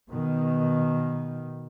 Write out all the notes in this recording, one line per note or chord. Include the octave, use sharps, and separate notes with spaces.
B2 D#3